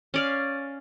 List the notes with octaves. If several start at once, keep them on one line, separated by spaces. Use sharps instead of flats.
C#4 D5 F5